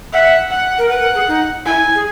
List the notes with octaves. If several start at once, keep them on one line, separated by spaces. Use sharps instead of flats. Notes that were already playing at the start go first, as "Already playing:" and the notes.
E5 F#5
F#5
A#4
B4 F#5
A#4
G#4
D#4
E4 G#5
G#4